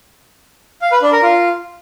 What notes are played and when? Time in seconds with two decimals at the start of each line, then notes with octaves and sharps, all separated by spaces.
0.82 F5
0.92 B4
1.02 D4
1.12 A#4
1.23 F4